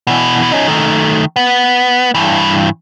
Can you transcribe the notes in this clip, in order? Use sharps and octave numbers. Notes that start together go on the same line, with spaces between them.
B2 E3
C#4 D#4
D#3 A3
B3
G2 E3